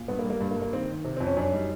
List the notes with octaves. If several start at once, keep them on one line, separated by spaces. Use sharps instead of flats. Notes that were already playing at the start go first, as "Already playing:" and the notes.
Already playing: A#2
G2 B3
A#3
G3
A#3
G2
A#3
G2
A#3
D#3 C4
D#3
C3
F2 C4
C#4
F#2 D4
G3 D#4